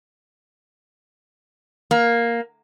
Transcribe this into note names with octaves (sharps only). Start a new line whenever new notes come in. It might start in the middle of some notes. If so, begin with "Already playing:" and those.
A#3